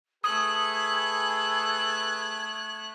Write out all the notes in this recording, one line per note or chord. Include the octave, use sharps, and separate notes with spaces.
A3 G#4 A4 B4 D#6 F#6 G#6